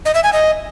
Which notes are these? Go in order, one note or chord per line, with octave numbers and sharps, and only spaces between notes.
D#5
E5
G#5
D#5